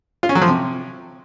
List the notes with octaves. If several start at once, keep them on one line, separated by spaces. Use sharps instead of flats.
F4
C#4
F#3
F3
C3